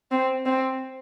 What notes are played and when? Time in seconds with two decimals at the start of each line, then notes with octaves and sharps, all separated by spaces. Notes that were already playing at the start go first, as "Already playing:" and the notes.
0.11 C4
0.46 C4